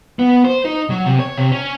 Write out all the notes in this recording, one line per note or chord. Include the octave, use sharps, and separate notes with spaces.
B3
C5
D#4
F#3
C3
C#5
C3
C#4